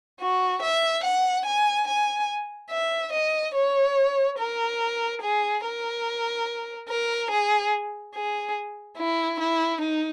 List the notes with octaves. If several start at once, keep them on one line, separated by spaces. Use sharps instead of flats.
F#4
E5
F#5
G#5
G#5
E5
D#5
C#5
A#4
G#4
A#4
A#4
G#4
G#4
E4
E4
D#4